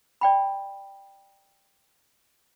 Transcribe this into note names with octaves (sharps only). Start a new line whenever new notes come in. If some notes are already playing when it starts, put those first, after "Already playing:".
D5 G5 B5